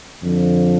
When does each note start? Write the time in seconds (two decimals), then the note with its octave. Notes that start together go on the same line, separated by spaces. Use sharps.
0.24 F2 D3 F3